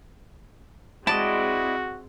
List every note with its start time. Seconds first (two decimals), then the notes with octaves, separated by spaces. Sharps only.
1.07 G#3 C4 E4 F#4 D5 D#5 A5